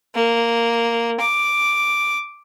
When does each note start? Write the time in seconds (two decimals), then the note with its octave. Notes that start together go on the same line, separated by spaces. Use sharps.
0.15 A#3
1.20 D6